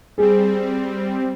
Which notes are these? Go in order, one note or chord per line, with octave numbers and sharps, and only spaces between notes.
G3 C4 G#4